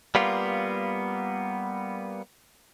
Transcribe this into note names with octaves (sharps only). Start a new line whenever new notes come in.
G3 A#3 B3 F4